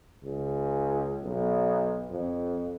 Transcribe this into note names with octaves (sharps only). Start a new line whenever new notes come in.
C#2
B1
F2